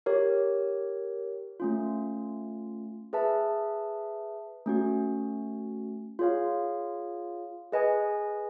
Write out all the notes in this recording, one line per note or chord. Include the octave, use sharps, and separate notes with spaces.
G4 A#4 C#5
A3 C#4 F4
G#4 B4 E5 A5
A3 C#4 F#4
F4 G#4 C#5 F5
G#4 B4 D#5 G#5